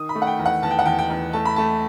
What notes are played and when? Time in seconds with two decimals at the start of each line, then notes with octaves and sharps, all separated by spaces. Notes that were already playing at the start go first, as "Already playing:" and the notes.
Already playing: D#3 D#6
0.09 B5
0.15 A3
0.22 F#5
0.27 G5
0.39 E2
0.46 F#5
0.63 E2 A5
0.71 G5
0.79 F#5
0.86 E2 G5
0.99 G5
1.10 E2
1.33 A3 A5
1.45 B5
1.56 A3 A5